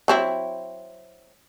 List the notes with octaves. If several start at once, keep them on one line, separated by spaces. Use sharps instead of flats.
F#3 C4 E4